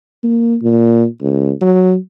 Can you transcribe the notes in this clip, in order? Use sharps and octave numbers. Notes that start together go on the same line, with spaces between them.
A#3
A#2
C#2
F#3